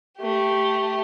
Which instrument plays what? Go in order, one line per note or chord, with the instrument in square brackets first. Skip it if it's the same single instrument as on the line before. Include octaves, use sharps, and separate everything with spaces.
[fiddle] A3 G4